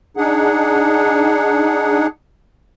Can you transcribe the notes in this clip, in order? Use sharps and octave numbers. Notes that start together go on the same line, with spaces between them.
D4 D#4 G#4 F#5